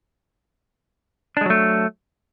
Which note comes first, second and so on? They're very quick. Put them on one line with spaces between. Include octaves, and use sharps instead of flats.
D4 G#3 F#3 A3